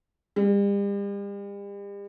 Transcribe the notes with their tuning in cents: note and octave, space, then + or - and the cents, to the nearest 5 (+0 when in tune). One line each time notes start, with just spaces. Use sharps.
G3 +40